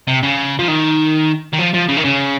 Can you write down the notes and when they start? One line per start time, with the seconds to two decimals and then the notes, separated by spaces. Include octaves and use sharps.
0.08 C3
0.23 C#3
0.59 F3
0.68 D#3
1.53 D#3
1.58 F3
1.74 F3
1.88 C#3
1.97 D#3
2.04 C#3